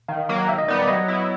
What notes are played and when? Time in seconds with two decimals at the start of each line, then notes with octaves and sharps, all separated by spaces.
0.08 D#3 F5
0.29 F#3 A#3
0.48 D#3 E5
0.58 D#5
0.68 G3 B3 D#4 D5
0.79 D5
0.88 F#3 D#5
1.08 B3 E4